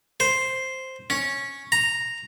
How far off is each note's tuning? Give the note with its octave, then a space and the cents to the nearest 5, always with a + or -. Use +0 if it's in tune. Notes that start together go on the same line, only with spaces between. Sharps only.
C5 +0
C#4 -5
A#5 -5